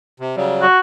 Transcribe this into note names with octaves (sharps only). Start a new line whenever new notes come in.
C3
C#3 F#3 G3
F#4